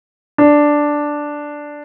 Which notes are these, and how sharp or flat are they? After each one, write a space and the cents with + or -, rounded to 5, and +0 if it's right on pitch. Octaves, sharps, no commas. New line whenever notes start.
D4 +0